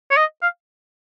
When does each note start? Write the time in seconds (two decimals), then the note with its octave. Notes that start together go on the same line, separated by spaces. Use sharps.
0.11 C#5
0.17 D#5
0.42 F5